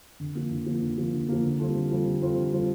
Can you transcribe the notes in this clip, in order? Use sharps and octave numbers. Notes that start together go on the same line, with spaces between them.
D3
F3 A#3
D3
F3 A#3
D3
F3 A#3
D3
F3 A#3
D3
G3 C4 F4 A4
D3
G3 C4 F4 A4
D3
G3 C4 F4 A4
D3
G3 C4 F4 A4